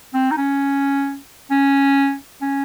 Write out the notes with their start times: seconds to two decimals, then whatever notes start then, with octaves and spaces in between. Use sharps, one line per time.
0.14 C4
0.31 D#4
0.37 C#4
1.51 C#4
2.41 C#4